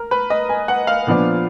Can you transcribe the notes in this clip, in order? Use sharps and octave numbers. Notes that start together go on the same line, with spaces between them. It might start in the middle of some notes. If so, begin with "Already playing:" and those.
Already playing: A#4
B4
D#5
G#5
F#5
F5
A#2 F3 B3 D4